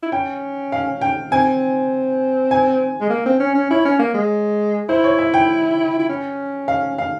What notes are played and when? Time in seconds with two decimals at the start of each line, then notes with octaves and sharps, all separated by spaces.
0.03 E4
0.12 C#4 G5
0.72 F5
1.01 G5
1.32 C4 G#5
2.51 G#5
3.01 G#3
3.10 A#3
3.26 C4
3.40 C#4
3.55 C#4
3.70 E4 C#5
3.85 C#4
3.99 A#3
4.14 G#3
4.89 E4 C5
5.04 C#5
5.19 E5
5.34 G5
5.99 E4
6.09 C#4
6.68 F5
6.98 F5